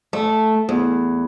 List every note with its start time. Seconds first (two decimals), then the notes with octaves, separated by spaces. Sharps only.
0.13 A3
0.69 E2